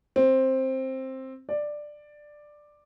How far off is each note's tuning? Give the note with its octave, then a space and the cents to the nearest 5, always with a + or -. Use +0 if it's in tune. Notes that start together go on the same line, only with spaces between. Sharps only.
C4 +10
D5 +10